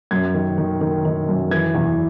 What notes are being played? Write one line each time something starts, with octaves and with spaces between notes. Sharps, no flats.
F#2 G#6
D#3
D#3
D#3
D#3
F#2
E3 G#6
E2